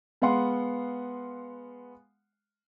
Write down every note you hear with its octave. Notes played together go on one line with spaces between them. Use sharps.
G#3 B3 F5 F#5 C6